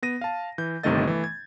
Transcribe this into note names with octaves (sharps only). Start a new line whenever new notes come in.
B3 A#6 D#7
F5 A5
E3 G6
G1 C3 D#3 A3 D#5 A6
E3 A3
G#6